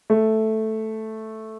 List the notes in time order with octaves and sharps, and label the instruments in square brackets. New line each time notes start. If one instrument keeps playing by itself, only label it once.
[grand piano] A3